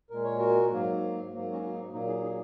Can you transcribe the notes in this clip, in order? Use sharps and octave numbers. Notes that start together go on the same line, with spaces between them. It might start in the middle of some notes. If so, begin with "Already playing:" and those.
A#2 G#3 A#4
C#5
F#4 A#4
G#2 F#3 A#3
G#2 F#3 A#3
C#4 F#4
D#4
A#2 F#3 A#3 D#4
D#4 G#4
D#4 G#4